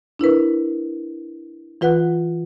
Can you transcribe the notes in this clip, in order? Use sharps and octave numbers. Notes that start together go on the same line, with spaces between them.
D4 E4 A#4 B4
E3 F4 B4 F#5 F#6